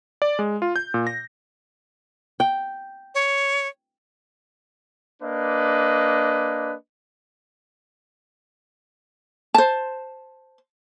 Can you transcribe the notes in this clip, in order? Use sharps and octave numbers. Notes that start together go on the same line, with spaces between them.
D5
G#3
F4
G6
A#2
A#6
G5
C#5
A#3 D4 B4 D#5
C5 A5